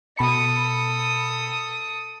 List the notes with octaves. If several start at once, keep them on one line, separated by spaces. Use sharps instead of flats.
B2 A4 B5 D#6 C#7